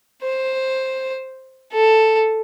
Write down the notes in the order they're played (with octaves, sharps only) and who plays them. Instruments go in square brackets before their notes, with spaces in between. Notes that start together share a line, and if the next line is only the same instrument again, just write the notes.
[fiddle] C5
A4